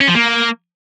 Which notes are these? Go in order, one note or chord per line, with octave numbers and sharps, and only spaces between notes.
C#4
F3
A#3